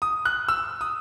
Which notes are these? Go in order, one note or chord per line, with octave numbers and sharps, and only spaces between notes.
D#6
F#6
E6
D#6